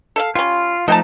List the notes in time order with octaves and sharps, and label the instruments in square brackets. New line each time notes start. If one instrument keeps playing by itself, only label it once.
[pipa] A4 E5 F5
[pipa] G3 C#4 [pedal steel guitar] F4
[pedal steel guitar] F3 A3 D#4 [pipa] D#5 G5 A5